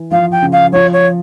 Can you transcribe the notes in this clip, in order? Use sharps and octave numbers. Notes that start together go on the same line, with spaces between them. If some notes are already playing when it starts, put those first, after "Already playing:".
Already playing: E3
F3 F5
G5
C#3
F5
F3 C#5
C#5